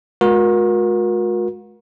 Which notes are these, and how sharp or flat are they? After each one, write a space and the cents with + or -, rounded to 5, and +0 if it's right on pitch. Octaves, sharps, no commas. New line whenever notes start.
G#3 +30 F#4 -40 A#4 +30